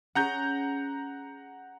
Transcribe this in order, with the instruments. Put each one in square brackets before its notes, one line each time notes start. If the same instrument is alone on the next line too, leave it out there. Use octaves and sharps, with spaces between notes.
[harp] C#4 G#4 C#5 [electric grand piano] F#5 A#5 G6